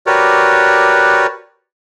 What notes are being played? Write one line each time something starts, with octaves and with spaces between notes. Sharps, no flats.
F#4 G4 A#4 B4 C#5 D5